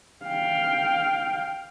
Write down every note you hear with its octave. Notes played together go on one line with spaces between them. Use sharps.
F5 G5